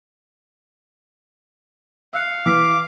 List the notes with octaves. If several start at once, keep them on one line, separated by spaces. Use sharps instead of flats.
F5 E6 F#6 C#7
E3 D6 E6 F6 B6